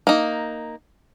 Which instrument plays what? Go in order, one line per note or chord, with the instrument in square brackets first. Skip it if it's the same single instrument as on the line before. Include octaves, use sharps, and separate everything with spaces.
[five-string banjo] A#3 D#4